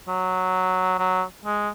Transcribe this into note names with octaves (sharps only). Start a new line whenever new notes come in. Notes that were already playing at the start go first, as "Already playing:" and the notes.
F#3
F#3
G#3